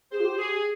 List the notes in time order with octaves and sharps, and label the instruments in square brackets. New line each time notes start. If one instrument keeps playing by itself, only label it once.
[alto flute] G#4 [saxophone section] C5
[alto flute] F4
G4
[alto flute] G4 [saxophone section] G#4